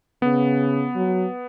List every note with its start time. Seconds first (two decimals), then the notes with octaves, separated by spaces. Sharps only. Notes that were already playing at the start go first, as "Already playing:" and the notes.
0.22 C#3 B3
0.96 F#3